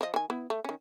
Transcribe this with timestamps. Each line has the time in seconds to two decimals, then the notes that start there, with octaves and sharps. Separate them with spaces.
0.01 F3 D#5
0.14 D#3 G#5
0.30 B3 E4
0.50 A3
0.64 D#3 C#4